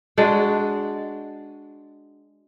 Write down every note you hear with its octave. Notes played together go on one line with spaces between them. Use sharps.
G#3 D4 F#4